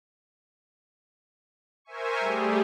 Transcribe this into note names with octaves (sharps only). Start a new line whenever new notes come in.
A#4 C5 E5 G#5 C#6
G3 A3 G4 G#4